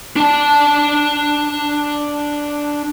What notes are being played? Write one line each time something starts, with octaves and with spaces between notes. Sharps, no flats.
D4 A5